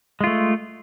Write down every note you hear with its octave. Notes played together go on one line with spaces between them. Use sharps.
G#3 A3 F4